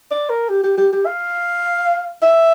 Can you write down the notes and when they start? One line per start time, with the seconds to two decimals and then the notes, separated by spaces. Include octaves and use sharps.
0.11 D5
0.30 A#4
0.49 G4
0.64 G4
0.78 G4
0.93 G4
1.06 F5
2.22 E5